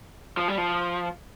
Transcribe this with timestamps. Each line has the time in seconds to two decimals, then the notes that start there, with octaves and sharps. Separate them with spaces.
0.37 F3
0.48 G3
0.58 F3